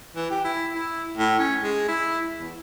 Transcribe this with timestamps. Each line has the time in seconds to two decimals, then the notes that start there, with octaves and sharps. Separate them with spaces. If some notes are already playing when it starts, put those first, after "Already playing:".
0.16 E3
0.30 G4
0.44 E4
0.74 E4
1.17 A2
1.39 C#4
1.63 G#3
1.88 E4
2.39 E2